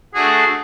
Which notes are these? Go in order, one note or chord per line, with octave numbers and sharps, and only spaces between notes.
A3 D4 F#4 G#4